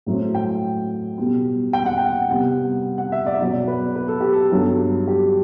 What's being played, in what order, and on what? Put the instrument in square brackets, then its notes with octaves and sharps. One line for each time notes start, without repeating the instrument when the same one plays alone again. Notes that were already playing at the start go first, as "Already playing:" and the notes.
[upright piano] A2 F#3 A3 C4
G5
B2 G3 B3
G5
F#5
G5
C3 G3 B3 F#5
F#5
E5
D5
E5
B2 F#3 B3 D5
B4
B4
A4
G4
A4
G2 F#3 B3
G4